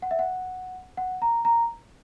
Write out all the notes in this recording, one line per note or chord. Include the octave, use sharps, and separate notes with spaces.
F#5
E5
F#5
F#5
A#5
A#5